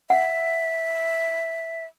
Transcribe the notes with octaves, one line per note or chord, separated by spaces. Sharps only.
E5 F#5